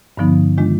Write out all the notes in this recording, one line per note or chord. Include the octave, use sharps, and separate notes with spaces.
G2 D3 F3 B3 D#4
D#3 G#3 D4 F4